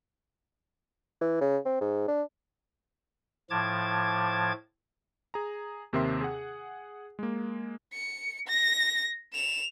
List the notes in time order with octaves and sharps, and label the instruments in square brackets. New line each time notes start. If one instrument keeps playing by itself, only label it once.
[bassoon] E3
C#3
C4
G#2
D4
[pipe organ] A2 F3 A5 D6 G#6
[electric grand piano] G#4 A#5
D#2 C3 C4 A#4 E5 C6
G#4 F#5
G#3 A#3
[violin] C#7
A#6
E7 F7